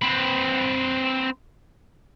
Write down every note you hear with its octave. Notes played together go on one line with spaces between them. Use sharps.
C4 B4